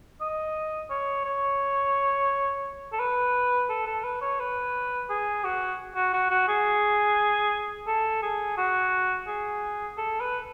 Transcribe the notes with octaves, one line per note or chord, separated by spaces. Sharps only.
D#5
C#5
C#5
A4
B4
A4
A4
B4
C#5
B4
G#4
F#4
F#4
F#4
F#4
G#4
A4
G#4
F#4
G#4
A4
B4